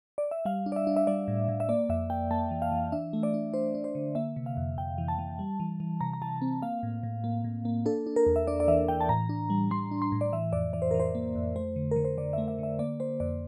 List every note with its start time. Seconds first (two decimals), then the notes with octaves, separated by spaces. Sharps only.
0.18 D5
0.31 E5
0.45 G3 F5
0.66 D4
0.72 D5
0.76 E5
0.87 D4
0.97 E5
1.07 G3 D5
1.28 A2
1.48 A2
1.60 E5
1.69 A#3 D5
1.89 F2 E5
2.10 A#3 G5
2.31 A#3 A5
2.51 E3
2.62 F5
2.72 E3
2.92 D4 E5
3.13 A3
3.23 D5
3.34 D4
3.53 D4 C5
3.75 D4
3.84 C5
3.95 D3
4.15 A#3 E5
4.36 C3
4.46 F5
4.57 F2
4.78 F2 G5
4.98 E3
5.08 A5
5.19 E3
5.39 G3
5.60 E3
5.80 E3
6.01 C3 A#5
6.13 A#5
6.22 E3 A5
6.42 C4
6.62 A#3 F5
6.83 A2
7.03 A2
7.24 A#3
7.44 A2
7.65 A#3
7.86 D4 A4
8.07 D4
8.16 A#4
8.26 E2
8.36 E5
8.47 D4 D5
8.60 D5
8.68 E3 E5
8.88 E3 G5
9.01 A5
9.09 A2 A#5
9.29 D4
9.50 G3
9.71 G3 C6
9.91 D4
10.02 C6
10.12 A2
10.21 D5
10.32 E3 E5
10.53 F2 D5
10.73 E3 D5
10.82 C5
10.91 E3 A#4
11.00 C5
11.15 A#3
11.35 F2
11.56 A3 C5
11.76 D3
11.91 D3 A#4
12.05 C5
12.18 D3 D5
12.33 A3 E5
12.48 E5
12.59 D3 E5
12.79 A#3 D5
13.00 A#3 C5
13.20 F2 D5